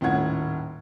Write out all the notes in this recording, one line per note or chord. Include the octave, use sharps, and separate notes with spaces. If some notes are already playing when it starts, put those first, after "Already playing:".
D#1 A2 C#4 F4 F#5 G#6